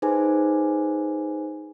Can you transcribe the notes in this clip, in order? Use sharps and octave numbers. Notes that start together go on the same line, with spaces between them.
D#4 G#4 B4 C5 G#5